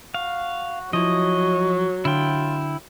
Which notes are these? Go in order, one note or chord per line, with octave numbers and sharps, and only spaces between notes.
F#4 F5
F3 F#3 E4 D#5 C#6
D3 E4 F4 G5